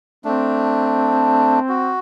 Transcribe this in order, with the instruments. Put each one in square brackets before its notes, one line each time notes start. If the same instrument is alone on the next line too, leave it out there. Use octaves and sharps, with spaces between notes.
[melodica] A3 D4 [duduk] C4
[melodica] F#4